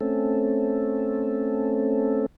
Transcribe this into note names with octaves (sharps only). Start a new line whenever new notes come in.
A3 C4 C#4 A4